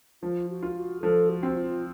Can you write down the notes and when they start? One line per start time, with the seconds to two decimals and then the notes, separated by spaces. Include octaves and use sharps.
0.23 F3 F4
0.49 F#4
0.63 F4
0.76 F#4
1.02 F3 A4
1.29 F#4
1.43 C4
1.56 F4